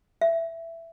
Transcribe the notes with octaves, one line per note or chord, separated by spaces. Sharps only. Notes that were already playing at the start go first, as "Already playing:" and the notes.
E5